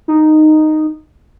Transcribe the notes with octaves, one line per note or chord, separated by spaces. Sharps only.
D#4